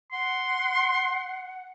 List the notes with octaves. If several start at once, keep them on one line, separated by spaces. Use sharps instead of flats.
F#5 C6